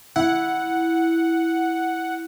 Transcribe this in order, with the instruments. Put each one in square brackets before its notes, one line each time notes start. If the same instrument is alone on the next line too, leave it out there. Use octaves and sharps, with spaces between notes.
[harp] E4 [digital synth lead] F#5